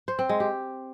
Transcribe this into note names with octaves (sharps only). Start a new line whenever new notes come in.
C5
C4
G#3
G4